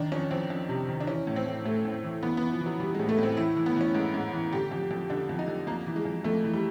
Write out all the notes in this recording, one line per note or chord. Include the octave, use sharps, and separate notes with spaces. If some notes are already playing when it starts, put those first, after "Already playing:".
Already playing: D#3 D4
F2 C#4
F2 C4
F2
C3
D#3
D4
E3 C#4
A2
C4
A2
A2 A3
A2
E3
E3 B3
E3 B3
F3
E3 F#3
E3 G3
A2 G#3
A3
A2 C4
E3 E4
E3
B3
E3 C#4
G#2
G#2
E3
D3 G4
F2
F2
D3 D4
F2
D#4
F2
F2 A#3
E3
G#3
F2
F2 A3
E3
G3